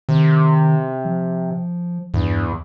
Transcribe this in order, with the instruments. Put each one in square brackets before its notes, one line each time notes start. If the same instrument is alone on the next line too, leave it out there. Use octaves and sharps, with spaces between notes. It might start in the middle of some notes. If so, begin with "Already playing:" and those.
[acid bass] C3 [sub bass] D#3
[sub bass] F3
[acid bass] E2 [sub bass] G2